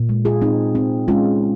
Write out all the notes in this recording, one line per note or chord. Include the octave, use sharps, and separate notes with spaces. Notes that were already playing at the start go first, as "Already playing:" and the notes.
Already playing: A#2
G#3
F4 G#4
C4 D#4
C4
G#3 C#4 F4